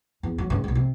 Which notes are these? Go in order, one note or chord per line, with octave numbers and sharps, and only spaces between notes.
E2
F#3
G2 C#3
B1 G3
C3